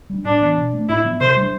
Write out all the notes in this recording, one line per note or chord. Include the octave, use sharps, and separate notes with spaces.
G3 D4
A2 D4
E3 B3
B2
A3 C4
A2 E4
F3 B3
C3 C5
G3 D4